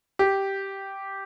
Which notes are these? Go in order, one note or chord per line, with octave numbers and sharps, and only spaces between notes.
G4